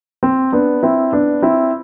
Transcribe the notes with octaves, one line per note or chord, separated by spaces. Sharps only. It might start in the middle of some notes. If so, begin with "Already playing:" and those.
C4
B3 D4
C4 E4
B3 D4
C4 E4